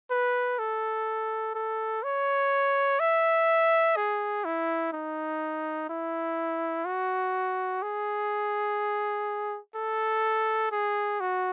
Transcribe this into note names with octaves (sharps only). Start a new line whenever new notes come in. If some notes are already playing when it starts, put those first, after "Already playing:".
B4
A4
A4
C#5
E5
G#4
E4
D#4
E4
F#4
G#4
A4
G#4
F#4